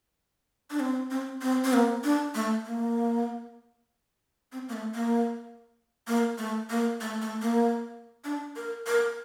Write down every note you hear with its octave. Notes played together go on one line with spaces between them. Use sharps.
D4
C4
C4
C4
C4
A#3
D4
A3
A#3
C4
A#3
A3
A#3
A#3
A3
A#3
A3
A3
A#3
D4
A#4
A#4